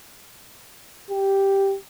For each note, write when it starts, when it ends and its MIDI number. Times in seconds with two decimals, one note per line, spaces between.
1.10 1.76 67